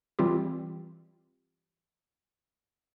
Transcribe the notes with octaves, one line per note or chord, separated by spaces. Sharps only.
E3 G3 C4 F4 G4